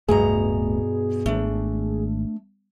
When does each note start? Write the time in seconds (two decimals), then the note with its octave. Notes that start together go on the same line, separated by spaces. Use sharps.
0.09 D1 G2 B2 A3 G#4 A#5
1.26 G#1 A3 D4